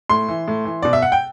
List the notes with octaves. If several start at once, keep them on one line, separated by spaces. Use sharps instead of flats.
A2 C6
E3
A2
E3
B2 D5
E5
F#5
G5